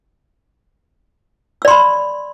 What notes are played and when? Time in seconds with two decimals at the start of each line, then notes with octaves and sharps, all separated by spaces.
1.62 E6
1.65 D5
1.68 C6
1.71 B5